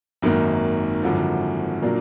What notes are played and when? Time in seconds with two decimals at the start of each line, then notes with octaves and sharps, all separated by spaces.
0.22 G#1 F#2 D#3 A#3
1.03 G#1 F#2 D3 F3
1.82 A#2 F#3 A#3 D4